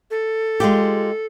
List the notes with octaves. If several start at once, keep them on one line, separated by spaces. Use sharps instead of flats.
A4
G#3 F4 G4